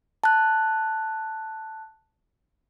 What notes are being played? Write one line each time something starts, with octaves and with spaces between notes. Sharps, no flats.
A5 F#6